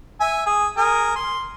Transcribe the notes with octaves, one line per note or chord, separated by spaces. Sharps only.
E5 G#5
G#4
G#4 A#4
C6